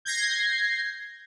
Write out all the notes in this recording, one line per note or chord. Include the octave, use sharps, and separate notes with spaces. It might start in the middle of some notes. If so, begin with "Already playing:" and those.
G6 G#6 A#6 C7